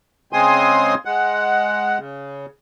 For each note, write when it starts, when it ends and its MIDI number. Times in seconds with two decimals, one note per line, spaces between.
0.33 0.95 49
0.33 0.95 56
0.33 0.95 60
0.33 0.95 80
0.33 0.95 84
0.33 0.95 87
1.05 1.98 56
1.05 1.98 78
1.99 2.46 49